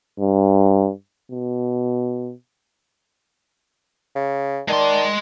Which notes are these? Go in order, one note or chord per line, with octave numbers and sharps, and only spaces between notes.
G2
B2
C#3
D#3 G#3 D5 A5 C6